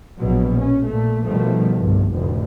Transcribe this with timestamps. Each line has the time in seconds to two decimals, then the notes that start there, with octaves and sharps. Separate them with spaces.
0.18 A#1 B2 F#3
0.57 C#4
0.88 A#2 A3
1.25 B2 D#3 F3 G3 A3
1.78 G1 C2 G2
2.14 F1 D2 A2